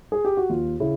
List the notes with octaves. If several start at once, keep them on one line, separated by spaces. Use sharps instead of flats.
G#4
G4
F#4
D#2 F4
C#3 E4